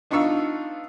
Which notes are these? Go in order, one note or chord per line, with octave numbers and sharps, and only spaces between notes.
B3 D4 D#4 F4 C#6 E6